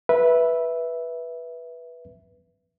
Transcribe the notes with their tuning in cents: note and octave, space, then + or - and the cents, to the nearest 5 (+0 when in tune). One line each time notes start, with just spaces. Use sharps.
B4 -10 E5 +0